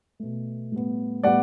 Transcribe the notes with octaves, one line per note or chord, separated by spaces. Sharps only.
B2 A3
A2 G3 B3
A2 G3 B3 D5 F#5